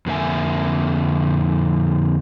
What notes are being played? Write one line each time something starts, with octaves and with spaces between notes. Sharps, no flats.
F2 D3 A#3 E5 G#5